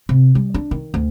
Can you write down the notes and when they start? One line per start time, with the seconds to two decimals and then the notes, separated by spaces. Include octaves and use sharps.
0.09 C3
0.35 G3
0.54 D4
0.71 D#3
0.94 D2